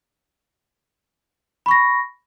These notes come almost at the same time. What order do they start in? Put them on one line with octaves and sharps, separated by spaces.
B5 C#6 A#6